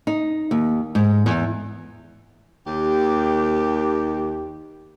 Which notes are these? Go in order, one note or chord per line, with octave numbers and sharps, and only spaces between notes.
D#4
D#2
G#2
E2
D#2 G4